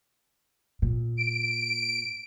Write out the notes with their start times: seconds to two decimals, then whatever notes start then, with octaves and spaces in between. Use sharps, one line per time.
0.82 A#2
1.17 D7